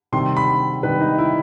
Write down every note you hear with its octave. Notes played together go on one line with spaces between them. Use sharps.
C3 D#3 G3 C6
B5
C3 D#3 G3 B4
D#4
E4